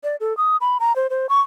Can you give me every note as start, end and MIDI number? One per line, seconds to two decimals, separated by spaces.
0.04 0.16 74
0.20 0.36 69
0.37 0.57 87
0.61 0.78 83
0.80 0.95 82
0.96 1.07 72
1.10 1.27 72
1.29 1.41 85